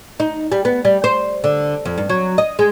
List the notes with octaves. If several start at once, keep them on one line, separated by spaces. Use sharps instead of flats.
D#4
G3
B3
G3
C5
D3
F2
G2
F#3
D#5
G#3